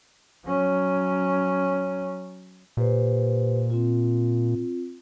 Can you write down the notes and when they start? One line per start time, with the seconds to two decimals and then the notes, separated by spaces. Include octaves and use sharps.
0.46 F#3 C#4
2.77 A#2 G4 B4 C5
3.70 C4 F4